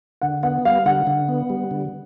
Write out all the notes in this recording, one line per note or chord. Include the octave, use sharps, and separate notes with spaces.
D3 F#5
B3 F#5
G3 F5
D3 F#5
D3
B3
G3
D3